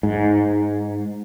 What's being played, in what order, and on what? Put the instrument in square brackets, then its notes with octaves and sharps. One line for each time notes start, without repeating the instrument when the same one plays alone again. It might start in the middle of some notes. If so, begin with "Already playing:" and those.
[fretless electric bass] G#2